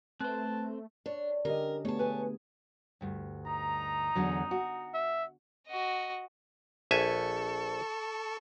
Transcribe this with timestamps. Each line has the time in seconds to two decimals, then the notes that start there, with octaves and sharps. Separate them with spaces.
0.20 A3 C4 B4 C5 A5 F#6
1.06 D4 C#5
1.45 D3 C#4 G4 A#4 D#5
1.85 A3 B3 G#4 C#5 A5
1.99 B4 G#5
3.01 D2 G2
3.46 D#4 A#5
4.15 E2 D3 F#3
4.51 F#4
4.94 E5
5.68 F#4 D#5
6.91 A#1 A4 E5 G#5 A5 C#6